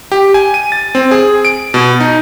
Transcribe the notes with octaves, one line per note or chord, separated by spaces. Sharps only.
G4
G#5
D#7
A6
C4
G#4
D7
B2
D#4